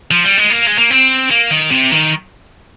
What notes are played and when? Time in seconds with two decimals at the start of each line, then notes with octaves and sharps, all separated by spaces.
0.11 F3
0.24 G3
0.38 G#3
0.51 A#3
0.67 G#3
0.79 A#3
0.91 C4
1.31 A#3
1.51 D#3
1.71 C3
1.92 D#3